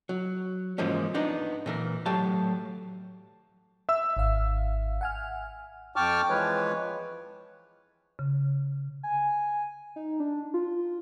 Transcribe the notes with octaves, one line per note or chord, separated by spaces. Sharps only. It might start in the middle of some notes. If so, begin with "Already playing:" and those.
F#3
G#2 E3 F3 G#3 A#3 C#4
B3 D4 D#4
A#2 E3 A#4
A2 F#3 G4 F5 A5
E5 E6
G#1 F5
F#5 G#5 F6
F2 G5 A5 C#6 D6 F6
E3 F3 G#3 B4 C#5
C#3
G#5
D#4
D4
F4